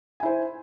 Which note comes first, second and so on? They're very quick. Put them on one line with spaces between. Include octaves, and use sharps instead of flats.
G#5 E4 C5